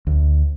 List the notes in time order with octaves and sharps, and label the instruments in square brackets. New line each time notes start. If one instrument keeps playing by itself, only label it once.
[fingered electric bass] D2